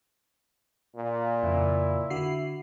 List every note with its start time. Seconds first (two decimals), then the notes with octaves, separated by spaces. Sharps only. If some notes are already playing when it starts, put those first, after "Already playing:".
0.96 A#2
1.43 F2 C#3 E4
2.10 D3 F#4 C7